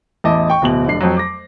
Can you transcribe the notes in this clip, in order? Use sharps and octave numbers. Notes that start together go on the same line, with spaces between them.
A1 E2 E4 D#5 A5 D6
G5 C#6
D1 B2 F#7
F1 D4 C7
F2 F#3
D6 A#6